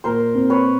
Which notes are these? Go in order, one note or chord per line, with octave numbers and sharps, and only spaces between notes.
A#2 A#4 C5
C4
B4 C#5